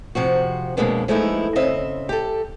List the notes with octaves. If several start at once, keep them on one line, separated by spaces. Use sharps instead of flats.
F2 C3 F3 F#4
F2 B2 G#3 A#3 B3 D4
F3 G#3 A3 B3 D#4 E4
C#3 C4 D#5 E5
G4 A4